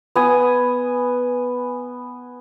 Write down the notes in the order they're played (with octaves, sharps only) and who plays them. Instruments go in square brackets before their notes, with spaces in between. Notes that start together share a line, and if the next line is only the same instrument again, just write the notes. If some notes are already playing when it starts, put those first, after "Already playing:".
[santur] B3 G#5 D#6